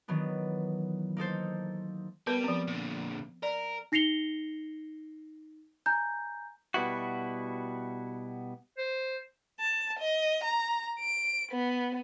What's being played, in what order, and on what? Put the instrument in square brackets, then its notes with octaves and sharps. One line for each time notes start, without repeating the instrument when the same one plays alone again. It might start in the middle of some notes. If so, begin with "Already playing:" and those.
[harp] D#3 E3 F#3 B3 D4
A#3 D#4 A4 C5
[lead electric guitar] G3 [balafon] B3 A#4 B4
[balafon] F3 C4
[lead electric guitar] A#2 D3
[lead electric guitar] A#4 [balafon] D5
[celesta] D#4 A#6 C7 C#7 F7 G7
G#5 A#5 G6
[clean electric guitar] B2 G3 B3 E4 F#4
[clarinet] C5
[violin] A5
D#5
A#5
D7
B3